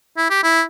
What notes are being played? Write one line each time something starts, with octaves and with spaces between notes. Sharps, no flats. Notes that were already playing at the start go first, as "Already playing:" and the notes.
E4
G4
E4